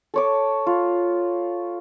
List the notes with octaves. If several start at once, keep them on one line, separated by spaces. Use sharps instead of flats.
A4 C#5 D6
F4